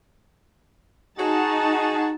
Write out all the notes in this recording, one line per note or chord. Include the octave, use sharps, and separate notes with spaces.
D#4 F#4 G#4 A5